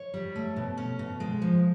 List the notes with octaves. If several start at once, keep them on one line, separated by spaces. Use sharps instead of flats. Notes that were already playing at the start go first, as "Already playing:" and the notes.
Already playing: C#5
G3
A3
B2
C#4
B2
G#3
F3